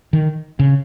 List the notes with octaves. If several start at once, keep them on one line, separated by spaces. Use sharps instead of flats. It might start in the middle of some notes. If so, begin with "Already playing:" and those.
D#3
C#3